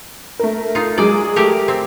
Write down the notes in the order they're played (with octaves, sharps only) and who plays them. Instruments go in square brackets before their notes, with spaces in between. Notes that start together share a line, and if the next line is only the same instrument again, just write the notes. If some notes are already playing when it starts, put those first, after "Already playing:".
[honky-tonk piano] A3 A#4
[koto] D#4 F4
[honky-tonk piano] F#3 G#3 G#4 [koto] D5
[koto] A3 G4 A#4
C4